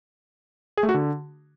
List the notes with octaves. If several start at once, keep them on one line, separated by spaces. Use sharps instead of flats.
G#4
A3
F#4
D3